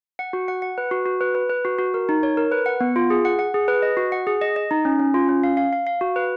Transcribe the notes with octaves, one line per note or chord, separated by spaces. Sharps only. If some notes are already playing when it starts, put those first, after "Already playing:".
F#5
F#4
F#5
F#5
B4
F#4
F#4
B4
B4
B4
F#4
F#4
A#4
D#4
C#5
A#4
B4
F#5
B3
F4
G#4
F#5
F#5
G#4
B4
D#5
F#4
F#5
G#4
D#5
D#5
D#4
C#4
C#4
F4
C#4
F5
F5
F5
F5
F#4
B4